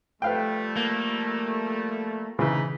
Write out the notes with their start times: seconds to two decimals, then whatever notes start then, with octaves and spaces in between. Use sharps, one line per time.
0.22 F3 G3 A3 B4 F5 G5
0.77 A#3
2.39 C#3 E3 D#4 A#5 B5